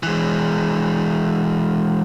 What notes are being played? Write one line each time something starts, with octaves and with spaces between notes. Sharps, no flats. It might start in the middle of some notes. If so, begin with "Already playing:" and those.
E3 G#3